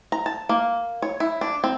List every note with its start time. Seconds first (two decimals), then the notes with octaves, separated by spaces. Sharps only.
0.12 A#5
0.26 A5
0.49 A#3
1.02 C#5
1.20 E4
1.41 D4
1.64 C4